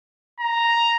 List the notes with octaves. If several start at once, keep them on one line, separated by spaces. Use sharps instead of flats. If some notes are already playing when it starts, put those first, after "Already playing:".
A#5